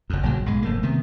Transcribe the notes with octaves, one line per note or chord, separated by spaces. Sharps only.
F#1 F2
F#1 A#2 C#3 F#3
B1 G#2 G#3
F1 A3 A#3
C3 D#3 B3